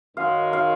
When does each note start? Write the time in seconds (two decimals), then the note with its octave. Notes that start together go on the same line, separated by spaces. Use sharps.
0.17 F#2 D#3 G#3 F5
0.53 F5